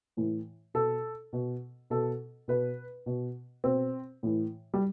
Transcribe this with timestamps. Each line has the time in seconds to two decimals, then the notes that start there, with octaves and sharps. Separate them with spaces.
0.17 A2 E3
0.74 B2 A4
1.33 B2
1.90 B2 A4
2.48 B2 B4
3.06 B2
3.64 B2 C4
4.23 A2 E3
4.74 G3